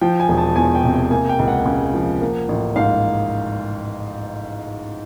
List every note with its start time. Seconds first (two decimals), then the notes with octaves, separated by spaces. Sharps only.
0.01 F3 G5
0.20 G#5
0.29 E1
0.38 A5
0.56 E2 G#5
0.75 G5
0.84 C3
0.93 G5
1.11 A#3 G#5
1.29 G5
1.39 C#2
1.48 F#5
1.66 C#3
1.94 F3
2.21 A#3
2.49 A1
2.76 G#2 F5